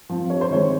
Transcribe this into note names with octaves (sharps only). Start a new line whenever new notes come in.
F3 C4
G2 C#5
C5
D#3 G#3 C4 C#5